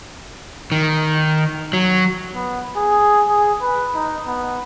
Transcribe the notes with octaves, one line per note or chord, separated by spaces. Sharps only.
D#3
F#3
B3
G#4
G#4
B4
D#4
B3